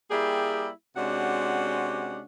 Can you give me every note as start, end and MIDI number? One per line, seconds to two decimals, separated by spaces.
0.11 0.67 55
0.11 0.67 58
0.11 0.67 64
0.11 0.67 67
0.11 0.67 68
0.96 2.21 48
0.96 2.21 56
0.96 2.21 61
0.96 2.21 62
0.96 2.21 66
0.96 2.21 78